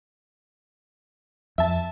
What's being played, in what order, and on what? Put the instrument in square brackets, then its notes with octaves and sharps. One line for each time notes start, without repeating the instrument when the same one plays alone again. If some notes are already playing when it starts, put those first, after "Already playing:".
[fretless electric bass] F2 [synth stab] E5 A5